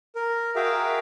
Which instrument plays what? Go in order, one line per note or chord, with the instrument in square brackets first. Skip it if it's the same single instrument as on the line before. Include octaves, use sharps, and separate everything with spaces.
[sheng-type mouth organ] A#4
F#4 G#4 A#4 E5 F5 G5